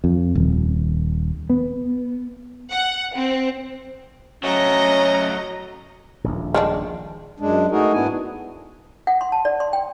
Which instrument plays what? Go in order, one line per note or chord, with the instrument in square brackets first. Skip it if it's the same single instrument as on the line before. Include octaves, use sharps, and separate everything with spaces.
[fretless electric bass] F2
D#1
B3
[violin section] F#5
C4
[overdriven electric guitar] F#3 A3 [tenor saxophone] C#4 [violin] D#5 A#5
[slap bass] D#1 A#1
[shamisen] D#3 G#3 D4
[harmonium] F#2 G#3 D4
A3 D#4 F#4 G#4 A#4
G#2 B3 D4 E4 G#5
[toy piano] F#5
C6
A5
D5
C6
G5